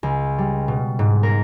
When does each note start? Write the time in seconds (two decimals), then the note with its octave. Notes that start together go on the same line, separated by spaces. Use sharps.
0.03 C#2
0.38 G3
0.68 B2
0.99 G#2
1.23 A#4